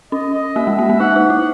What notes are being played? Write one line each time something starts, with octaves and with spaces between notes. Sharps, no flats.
C#4 D#5
D#5
A#3 E5
G#3
A#3
A#3
D#4 F#5
D#4
E4